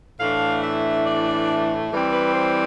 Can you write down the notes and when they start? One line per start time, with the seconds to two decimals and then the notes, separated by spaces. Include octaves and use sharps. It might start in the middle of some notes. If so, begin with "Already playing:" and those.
0.19 A2 E3 A3 D4 F5
0.63 E5
1.05 D5
1.91 E3 G3 C4
2.12 B4
2.34 C5